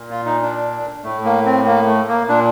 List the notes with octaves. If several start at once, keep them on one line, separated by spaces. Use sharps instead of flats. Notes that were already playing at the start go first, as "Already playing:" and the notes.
Already playing: A#2
F4
D#4
D4
A2 A3
A#3
C4
A#3
A3
A#3
A#2 D4